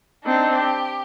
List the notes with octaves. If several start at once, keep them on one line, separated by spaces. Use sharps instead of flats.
C4 D4 D#4
G4